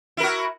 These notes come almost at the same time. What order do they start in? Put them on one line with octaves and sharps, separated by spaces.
E4 A#4 F#4